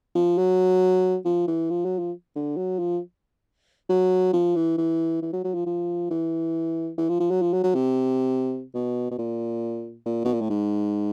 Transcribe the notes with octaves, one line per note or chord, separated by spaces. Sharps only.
F3
F#3
F3
E3
F3
F#3
F3
D3
F#3
F3
F#3
F3
E3
E3
E3
F#3
F#3
F3
F3
E3
E3
F3
F3
F#3
F3
F#3
F#3
C3
B2
B2
A#2
A#2
B2
A#2
A2
G#2